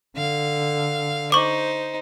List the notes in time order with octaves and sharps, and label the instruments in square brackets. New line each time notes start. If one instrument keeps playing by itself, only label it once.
[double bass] D3 [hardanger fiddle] F5
[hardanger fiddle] D#4 C5 [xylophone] C#6 D6